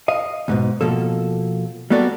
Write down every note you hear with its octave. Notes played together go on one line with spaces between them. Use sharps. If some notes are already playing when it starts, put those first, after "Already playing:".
D#5 F5
D#2 G#2 B2
B2 F3 A#3 A4
G3 A#3 B3 F#4 A4 D5